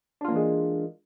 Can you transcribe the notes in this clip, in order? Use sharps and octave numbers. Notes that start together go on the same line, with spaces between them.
E3 G#3 A#3 D4 F4